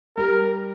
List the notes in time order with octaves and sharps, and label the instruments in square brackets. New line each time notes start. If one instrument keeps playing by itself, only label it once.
[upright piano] G3 [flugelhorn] A#4